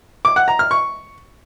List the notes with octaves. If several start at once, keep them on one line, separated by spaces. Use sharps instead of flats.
D6
F#5
A#5
F6
C#6